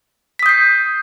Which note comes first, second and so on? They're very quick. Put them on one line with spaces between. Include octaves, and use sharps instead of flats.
B6 D#6 G6 C7